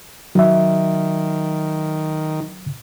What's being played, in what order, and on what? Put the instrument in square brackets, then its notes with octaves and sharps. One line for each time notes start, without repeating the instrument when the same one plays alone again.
[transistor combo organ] D#3 [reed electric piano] F#3 E5